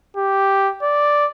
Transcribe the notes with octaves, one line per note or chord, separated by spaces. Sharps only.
G4
D5